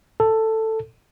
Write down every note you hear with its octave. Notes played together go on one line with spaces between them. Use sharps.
A4